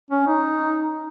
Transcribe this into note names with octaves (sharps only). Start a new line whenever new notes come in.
C#4
D#4